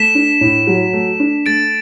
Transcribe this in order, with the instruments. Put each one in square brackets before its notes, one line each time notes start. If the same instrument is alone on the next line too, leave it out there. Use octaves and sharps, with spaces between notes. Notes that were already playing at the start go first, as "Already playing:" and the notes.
Already playing: [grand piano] A3 [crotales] B6 E7
[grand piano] D4
A2
F#3
A3
D4
[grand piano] A3 [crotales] A6 D7